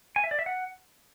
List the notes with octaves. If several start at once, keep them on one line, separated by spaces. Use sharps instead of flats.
G#5
E5
D5
E5
F#5